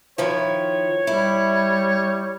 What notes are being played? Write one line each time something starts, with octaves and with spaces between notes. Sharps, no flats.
D#3 F3 E4 C#5
G3 E4